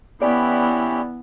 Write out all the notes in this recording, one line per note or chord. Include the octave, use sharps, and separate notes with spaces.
E3 B3 C#4 E4 G4 D5